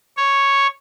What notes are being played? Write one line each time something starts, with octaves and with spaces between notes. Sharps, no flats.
C#5